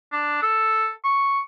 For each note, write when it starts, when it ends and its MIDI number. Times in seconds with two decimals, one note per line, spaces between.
0.12 0.40 62
0.43 0.90 69
1.04 1.40 85